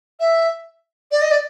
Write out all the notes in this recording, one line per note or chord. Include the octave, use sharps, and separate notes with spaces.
E5
D5
D#5
D5